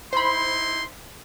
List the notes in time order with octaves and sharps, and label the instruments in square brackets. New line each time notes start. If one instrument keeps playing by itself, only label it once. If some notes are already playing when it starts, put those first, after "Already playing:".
[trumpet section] D#4 E4 C6 [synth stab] C5 B5